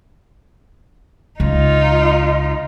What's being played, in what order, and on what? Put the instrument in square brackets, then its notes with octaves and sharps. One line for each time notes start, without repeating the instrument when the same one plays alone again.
[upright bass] C#2 [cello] D#4 F4